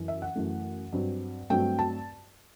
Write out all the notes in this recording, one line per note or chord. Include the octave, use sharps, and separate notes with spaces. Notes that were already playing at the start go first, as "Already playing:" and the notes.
Already playing: F#2 E3
E5
F#5
F#2 E3 A3
G2 F#3 C4
G2 F#3 A3 C4 G5
A5